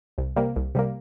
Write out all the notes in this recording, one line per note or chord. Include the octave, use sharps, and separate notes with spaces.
C2
C3 G3 A#3
C2
C3 G3 A#3